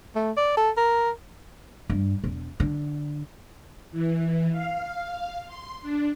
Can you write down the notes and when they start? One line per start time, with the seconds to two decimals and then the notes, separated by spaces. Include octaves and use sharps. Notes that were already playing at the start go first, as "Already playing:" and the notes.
0.15 A3
0.37 D5
0.57 A4
0.77 A#4
1.90 G2
2.24 E1
2.60 D3
3.92 E3
4.53 F5
5.46 C6
5.82 D4